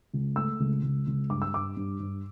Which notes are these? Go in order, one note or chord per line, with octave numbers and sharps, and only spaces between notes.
C#2
A3 E6
C#2
C#2
C#2
G2 D6
E6
G2 D6
G2
G2